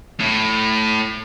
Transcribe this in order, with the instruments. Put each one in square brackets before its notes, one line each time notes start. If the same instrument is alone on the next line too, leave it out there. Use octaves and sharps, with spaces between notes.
[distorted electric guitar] A2